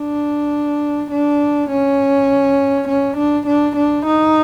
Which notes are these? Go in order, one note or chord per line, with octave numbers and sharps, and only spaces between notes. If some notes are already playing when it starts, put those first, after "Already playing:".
Already playing: D4
D4
C#4
C#4
D4
D4
D4
D#4